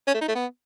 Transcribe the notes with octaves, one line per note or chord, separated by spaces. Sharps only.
C#4
A3
D#4
A3
B3